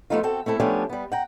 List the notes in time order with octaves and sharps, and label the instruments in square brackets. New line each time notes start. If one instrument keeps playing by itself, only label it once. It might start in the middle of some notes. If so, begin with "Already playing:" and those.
[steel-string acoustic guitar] F3 F#3 A3 B3 D#4 F4
C4 F#4 A4 G5
A3 C4 E4 A4
F3 A3 B3 C#4 D4 G4
G3 B3
F#5 G5 A#5